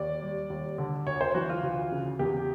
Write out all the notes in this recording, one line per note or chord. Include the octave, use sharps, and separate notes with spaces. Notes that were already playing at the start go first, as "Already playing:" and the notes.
Already playing: D#2 D5
G3
D#2
D3
D2 C#5
C5
E3 F#4
F4
D2
C#3
E2 G4